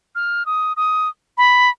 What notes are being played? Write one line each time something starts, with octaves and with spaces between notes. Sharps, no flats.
F6
D#6
D#6
B5